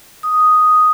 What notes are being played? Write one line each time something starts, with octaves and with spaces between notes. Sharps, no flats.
D#6